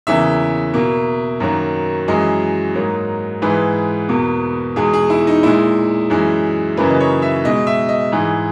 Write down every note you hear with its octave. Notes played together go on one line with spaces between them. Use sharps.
E2 C#3 E3 A#3 E5
B2 A#3
F#2 D#3 F#3 A#3
F#2 E3 G#3 D#5
G#2 F#3 A#3
G#2 E3 G#3 B4
E2 B2 A#3
E2 B2 G#3 G#4
G#4
E4
D#4
A#2 G#3 E4
F#2 E3 G#3
F#2 C#3 E3 A#3 B4
D#5
C#5
E5
B2 G#3 D#5
E5
D#5
G#2 E3 G#3